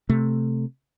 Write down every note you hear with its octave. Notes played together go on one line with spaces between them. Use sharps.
C3 A3